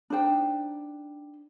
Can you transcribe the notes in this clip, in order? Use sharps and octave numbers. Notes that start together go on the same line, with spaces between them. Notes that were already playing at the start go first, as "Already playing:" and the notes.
D4 D#4 C5 G5